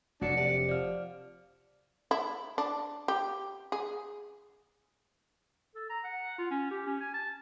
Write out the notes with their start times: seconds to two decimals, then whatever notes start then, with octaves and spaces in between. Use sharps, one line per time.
0.21 F1 F#3 A3 D4 F#5 C#7
0.37 C3 D5
0.69 F3 D5 F6
2.11 E4
2.58 D4
3.08 G4
3.72 G#4
5.75 A4
5.90 A#5
6.04 F#5
6.38 F4
6.51 C#4
6.71 G4
6.86 C#4
7.00 G#5
7.14 A5